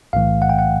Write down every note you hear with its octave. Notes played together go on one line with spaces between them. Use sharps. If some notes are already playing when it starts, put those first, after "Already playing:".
B1 A2 E3 A3 F5
F#5
G5
F#5